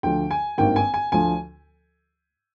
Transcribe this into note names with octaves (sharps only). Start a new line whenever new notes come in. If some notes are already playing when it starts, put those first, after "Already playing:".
D2 D3 F3 G5
G#5
G#1 G2 D#3 A#3 G5
G#5
G#5
D2 D3 F3 G#5